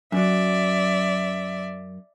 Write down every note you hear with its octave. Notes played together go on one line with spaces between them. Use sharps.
F#2 F#3 D5 E5